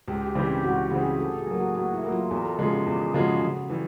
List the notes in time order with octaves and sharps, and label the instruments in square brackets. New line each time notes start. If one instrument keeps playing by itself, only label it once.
[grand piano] C#2 [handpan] G4
[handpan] G4
[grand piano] C#3 E3 G3 C4
[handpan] G4
[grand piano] C#2 [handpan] F#4
[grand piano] C#3 E3 G3 C4 [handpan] G#4
[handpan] G4
[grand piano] A2 [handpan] A4
[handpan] G#4
[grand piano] F#3 A#3
[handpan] F#4
[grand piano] A2 [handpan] F#4
[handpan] E4
[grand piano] F#3 A#3
[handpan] F4
[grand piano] E2 [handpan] A#4
[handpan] A4
[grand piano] C#3 F3 G#3
[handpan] G4
[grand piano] E2 [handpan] G#4
[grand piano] C#3 F3 G#3 [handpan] F#4
[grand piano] C#3
E3 G3